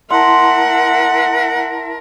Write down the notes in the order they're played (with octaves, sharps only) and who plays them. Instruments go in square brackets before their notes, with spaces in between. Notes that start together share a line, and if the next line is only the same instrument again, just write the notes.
[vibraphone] E4 A5 A#5 [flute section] A#4 E5 [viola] F#5 [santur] C6